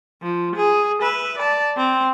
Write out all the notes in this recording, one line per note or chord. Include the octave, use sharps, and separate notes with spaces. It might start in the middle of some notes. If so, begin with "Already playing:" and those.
F3
G#4
B4 E5
D5 A5
C4